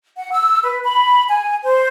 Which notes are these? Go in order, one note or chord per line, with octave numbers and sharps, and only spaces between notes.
F#5
E6
B4
B5
G#5
C5